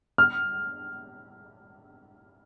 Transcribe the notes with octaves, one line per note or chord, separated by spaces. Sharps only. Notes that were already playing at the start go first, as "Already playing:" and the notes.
F6